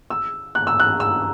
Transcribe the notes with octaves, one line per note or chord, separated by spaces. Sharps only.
E6
F#6
E6
F#6
E6